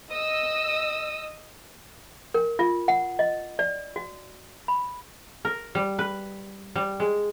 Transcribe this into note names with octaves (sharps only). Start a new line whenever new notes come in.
D#5 D#6 E6
A#4
F4
F#5
D#5
D5
F#4
B5
A#4
G3
B4
G3
G#3